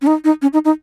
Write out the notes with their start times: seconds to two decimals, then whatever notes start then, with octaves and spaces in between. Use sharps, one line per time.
0.02 C#4
0.07 D#4
0.24 D#4
0.42 C#4
0.53 D#4
0.65 D#4